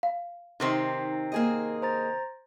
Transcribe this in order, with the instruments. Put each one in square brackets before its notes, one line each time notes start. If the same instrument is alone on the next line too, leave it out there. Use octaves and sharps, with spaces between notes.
[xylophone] F5
[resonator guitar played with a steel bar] C3 D#3 C4 [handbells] D#4 C7
[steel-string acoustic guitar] A#3 G#4 D#5
[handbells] C5 A#5 A6